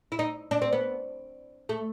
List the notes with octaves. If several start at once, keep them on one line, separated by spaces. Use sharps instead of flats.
E4
D#4
D4
C4
B3
A3